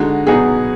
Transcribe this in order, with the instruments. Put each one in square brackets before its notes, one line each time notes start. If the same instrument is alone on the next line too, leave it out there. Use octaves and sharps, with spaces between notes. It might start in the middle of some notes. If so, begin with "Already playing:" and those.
Already playing: [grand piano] D3 G#3 D#4 F#4
[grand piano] B2 F#3 B3 D#4 F#4 [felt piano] G#4